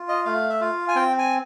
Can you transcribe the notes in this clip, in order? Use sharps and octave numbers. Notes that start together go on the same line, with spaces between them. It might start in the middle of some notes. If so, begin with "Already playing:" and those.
Already playing: F4
D#5
A3 F5
E5
F4 F5
G#5
C4 G5
G#5